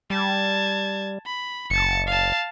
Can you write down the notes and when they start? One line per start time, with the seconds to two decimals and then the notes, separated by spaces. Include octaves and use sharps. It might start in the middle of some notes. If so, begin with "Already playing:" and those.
0.10 G3 A5 G#6
1.26 B5
1.70 F#1 A5 C#7
2.07 F5 A5